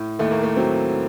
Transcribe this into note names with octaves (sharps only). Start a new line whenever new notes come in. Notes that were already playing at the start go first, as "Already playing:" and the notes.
Already playing: A2
D#2 A3
A#3
A3
F#3 C4